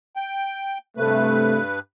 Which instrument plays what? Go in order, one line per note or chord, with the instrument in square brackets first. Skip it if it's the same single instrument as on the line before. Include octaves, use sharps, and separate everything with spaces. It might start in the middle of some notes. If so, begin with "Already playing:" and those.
[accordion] G5
[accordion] G2 B4 [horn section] C3 A3